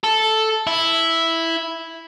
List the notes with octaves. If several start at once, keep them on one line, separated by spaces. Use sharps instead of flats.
A4
E4